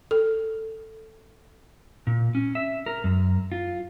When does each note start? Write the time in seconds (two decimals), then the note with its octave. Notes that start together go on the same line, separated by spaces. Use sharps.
0.11 A4
2.07 A#2
2.35 C#4
2.55 E5
2.86 A#4
3.04 F#2
3.52 F4